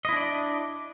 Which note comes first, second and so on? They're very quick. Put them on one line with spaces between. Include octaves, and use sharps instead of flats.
D#5 E4 D4 D5